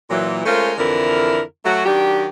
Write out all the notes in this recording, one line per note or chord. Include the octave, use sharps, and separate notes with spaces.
A#2 E3 F#3
G#3 A3 C#4 F4 A#4 C5
F2 D3 E3 E4 A#4
F#3 A3 F#4
D#3 F#3 D4 G4